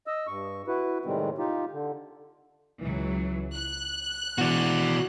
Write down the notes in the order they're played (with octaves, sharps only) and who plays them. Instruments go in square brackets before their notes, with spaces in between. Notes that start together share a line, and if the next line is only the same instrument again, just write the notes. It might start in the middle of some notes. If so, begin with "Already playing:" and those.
[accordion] D#5 E6
G2 C#6
E4 F#4 B4
A2 C3 D#3 G3 G#3 C4
D#4 F4 G4
D3
[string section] C#2 E3 F#3
F#6
[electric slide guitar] B2 E3 [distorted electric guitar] F#4 D5